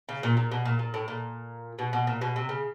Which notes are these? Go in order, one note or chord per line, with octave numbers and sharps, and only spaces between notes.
C#3
A#2
A#2
B2
A#2
A#2
A2
A#2
B2
B2
A#2
B2
C3
C#3